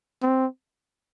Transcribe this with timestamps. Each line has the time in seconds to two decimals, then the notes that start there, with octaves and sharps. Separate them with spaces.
0.23 C4